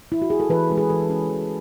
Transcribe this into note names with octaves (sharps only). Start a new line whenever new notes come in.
E4
F#4
G#4
A4
E3 B4
G#3 C#4
G#4
E3 A4
G#3 C#4
E3